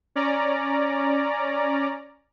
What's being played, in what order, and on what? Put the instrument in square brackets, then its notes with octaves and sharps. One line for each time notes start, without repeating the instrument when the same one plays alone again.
[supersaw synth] C#4 D5 A#5